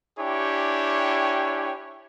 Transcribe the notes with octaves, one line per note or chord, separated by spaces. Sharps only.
D4 E4 G4 C#5 G5 G#5